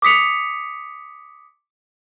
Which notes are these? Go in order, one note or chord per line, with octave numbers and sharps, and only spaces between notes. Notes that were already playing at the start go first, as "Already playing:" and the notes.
D6 D#6 B6 C#7 F7